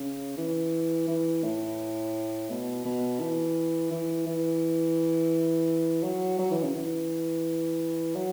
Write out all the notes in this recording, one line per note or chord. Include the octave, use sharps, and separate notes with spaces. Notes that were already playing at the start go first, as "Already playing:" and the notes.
Already playing: C#3
E3
E3
A2
B2
B2
E3
E3
E3
F#3
F#3
E3
C#3
E3
F#3